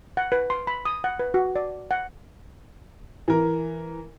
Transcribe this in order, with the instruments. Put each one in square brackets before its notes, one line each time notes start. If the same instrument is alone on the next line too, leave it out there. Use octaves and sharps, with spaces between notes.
[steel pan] F#5
B4
C6
B5
D#6
F#5
B4
F#4
D5
F#5
[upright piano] E3 A#4